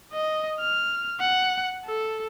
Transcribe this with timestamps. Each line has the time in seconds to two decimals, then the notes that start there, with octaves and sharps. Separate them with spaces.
0.13 D#5
0.60 F6
1.20 F#5
1.85 A4